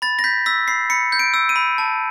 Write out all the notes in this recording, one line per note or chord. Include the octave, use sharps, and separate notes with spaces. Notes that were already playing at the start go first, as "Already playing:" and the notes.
B5 A6
A#6
G6 B6
E6 B6
B5 C7
B5 C#7
G6
D7
E6
D#7
B5
A5